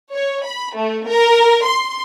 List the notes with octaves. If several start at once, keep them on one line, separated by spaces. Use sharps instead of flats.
C#5
B5
A3
A#4
C6